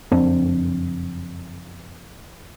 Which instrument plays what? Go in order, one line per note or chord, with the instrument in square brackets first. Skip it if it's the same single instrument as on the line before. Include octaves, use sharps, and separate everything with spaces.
[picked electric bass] F#1 F2 C4 D4